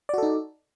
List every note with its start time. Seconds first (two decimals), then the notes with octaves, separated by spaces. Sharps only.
0.09 D5
0.14 F#4
0.18 A4
0.23 D#4